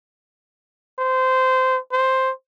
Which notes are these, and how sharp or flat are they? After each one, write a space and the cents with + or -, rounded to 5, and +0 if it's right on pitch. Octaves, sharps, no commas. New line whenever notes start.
C5 -20
C5 +5